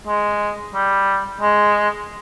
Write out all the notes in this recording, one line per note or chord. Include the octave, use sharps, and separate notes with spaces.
G#3
G3
G#3